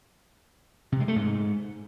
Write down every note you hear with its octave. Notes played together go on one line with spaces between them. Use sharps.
C3
G#3
A3
G#2